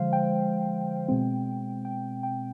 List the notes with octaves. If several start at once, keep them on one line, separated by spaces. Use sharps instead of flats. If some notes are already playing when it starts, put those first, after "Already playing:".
Already playing: D3 F3 G#3 C5 F5
G5
B2 G#3 C4
G5
G5